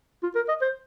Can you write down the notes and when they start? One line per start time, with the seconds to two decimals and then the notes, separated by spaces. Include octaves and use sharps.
0.23 F4
0.35 A#4
0.49 D#5
0.62 C5